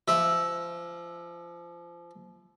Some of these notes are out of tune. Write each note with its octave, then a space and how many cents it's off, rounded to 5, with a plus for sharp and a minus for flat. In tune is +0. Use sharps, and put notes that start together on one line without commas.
F3 -25 E5 +0